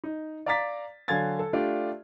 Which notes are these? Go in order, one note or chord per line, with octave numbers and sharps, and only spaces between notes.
D#4
D5 F5 A#5 D6 A6 B6
D3 F#3 F5 G#5 G#6 A6
A4
A3 D4 F4 G4 D5